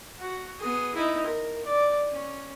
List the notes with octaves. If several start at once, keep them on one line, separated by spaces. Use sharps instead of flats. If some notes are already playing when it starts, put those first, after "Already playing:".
F#4
B3 G#4
D#4 E4
A#4
D5
C#4